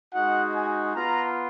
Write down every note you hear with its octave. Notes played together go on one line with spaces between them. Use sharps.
G#3 D#4 F#4 F#5
G#5
B3 F4 A#5